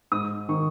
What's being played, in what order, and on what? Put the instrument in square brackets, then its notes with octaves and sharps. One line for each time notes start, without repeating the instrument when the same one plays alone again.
[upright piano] G#2 D#6
D#3 C#6